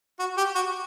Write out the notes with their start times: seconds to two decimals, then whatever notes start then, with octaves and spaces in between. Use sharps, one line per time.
0.19 F#4
0.37 G4
0.55 F#4